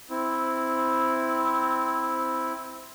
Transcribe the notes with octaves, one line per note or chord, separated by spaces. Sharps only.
C4 E4